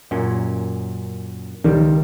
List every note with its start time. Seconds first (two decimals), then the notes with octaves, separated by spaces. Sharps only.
0.11 F#2 A#2 C#4
1.64 C#2 D#3 G3